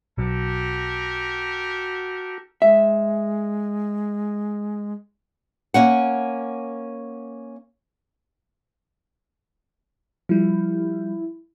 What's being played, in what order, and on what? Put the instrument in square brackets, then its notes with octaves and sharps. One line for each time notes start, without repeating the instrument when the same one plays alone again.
[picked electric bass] B1 [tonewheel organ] F#4 [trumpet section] G4 A4 A#4
[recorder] G#3 [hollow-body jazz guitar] E5
[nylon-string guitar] A#3 C#4 F#5
[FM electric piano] F3 G3 [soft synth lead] E4